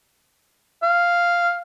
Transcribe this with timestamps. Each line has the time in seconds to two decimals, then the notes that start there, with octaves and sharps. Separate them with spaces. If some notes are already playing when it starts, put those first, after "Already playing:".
0.83 F5